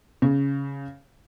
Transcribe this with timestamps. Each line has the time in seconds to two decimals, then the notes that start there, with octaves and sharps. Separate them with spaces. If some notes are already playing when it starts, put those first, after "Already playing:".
0.22 C#3